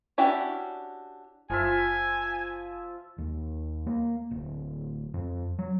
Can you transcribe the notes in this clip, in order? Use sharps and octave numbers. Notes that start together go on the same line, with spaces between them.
C#4 D4 E4 F#4 G4
F#1 F3 F4 E5 G#5
D#2
A#3
D1
F2
F#3